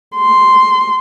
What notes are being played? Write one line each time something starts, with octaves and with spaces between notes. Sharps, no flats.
C6